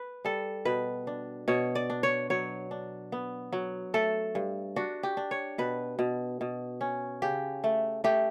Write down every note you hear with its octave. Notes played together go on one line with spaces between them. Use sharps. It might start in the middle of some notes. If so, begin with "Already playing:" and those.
Already playing: B4
G3 A4
B2 B4
D4
B2 C#5
D5
D4
C#5
F#3 C#5
D4
B3
F#3
A3 A4
G2
D4 F#4
G4
D4
C#5
B2 B4
B2
B2
C#4
C#3 G4
A3
A3 G4